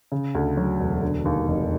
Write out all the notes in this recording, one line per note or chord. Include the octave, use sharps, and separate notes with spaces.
C#3
D2
F#3
E1
D3
D#2
F1